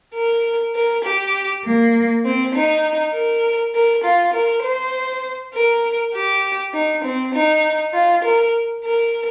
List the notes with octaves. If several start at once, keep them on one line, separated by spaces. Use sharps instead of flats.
A#4
A#4
G4
A#3
C4
D#4
A#4
A#4
F4
A#4
C5
A#4
G4
D#4
C4
D#4
F4
A#4
A#4